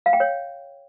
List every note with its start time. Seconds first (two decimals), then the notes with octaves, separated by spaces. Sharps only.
0.06 F5
0.13 G5
0.20 C#5